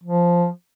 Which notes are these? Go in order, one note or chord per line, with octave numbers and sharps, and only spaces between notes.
F3